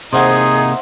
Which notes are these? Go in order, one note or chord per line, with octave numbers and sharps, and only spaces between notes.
C3 A#3 D#4 G#4 C5 E5 F#5